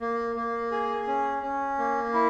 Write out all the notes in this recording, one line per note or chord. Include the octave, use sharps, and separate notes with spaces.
A#3
A#3
G#4
C#4
C#4
A#3
E4